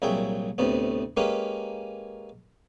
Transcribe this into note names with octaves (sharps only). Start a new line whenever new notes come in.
C2 A#2 F#3 G#4 E5 G5
D2 A2 C3 B3
G#3 A#3 C#4 G4 B4 F5